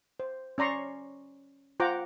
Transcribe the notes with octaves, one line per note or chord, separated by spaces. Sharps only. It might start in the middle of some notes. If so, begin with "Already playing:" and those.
C5
C#4 D5 A#5 C6 C#6
F4 C5 F#5 G5 A#5 D6